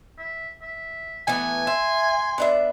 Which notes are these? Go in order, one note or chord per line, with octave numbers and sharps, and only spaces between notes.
E5
E5
E3 A3 B3 G#5
E5 C6
B3 D4 E5